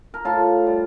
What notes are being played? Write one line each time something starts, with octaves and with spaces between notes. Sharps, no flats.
A#4
A2 F4 A4
G3